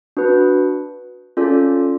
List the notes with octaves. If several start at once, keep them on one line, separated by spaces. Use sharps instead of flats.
D4 F#4 B4
C#4 F4 A4 D5